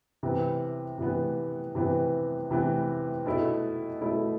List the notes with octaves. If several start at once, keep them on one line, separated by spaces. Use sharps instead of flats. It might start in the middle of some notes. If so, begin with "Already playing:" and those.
C3 E3 B3
C3 E3 B3
C3 E3 B3
C3 E3 B3
B2 A3 E4
B2 A3 E4